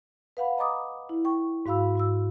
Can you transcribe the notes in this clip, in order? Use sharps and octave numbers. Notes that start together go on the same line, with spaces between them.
B4 F5 F#5 B5
D#5 A#5 B5 D6 D#6
E4
G5 C#6
G#2 F#4 F5 B5 E6
G#2 F#4 E6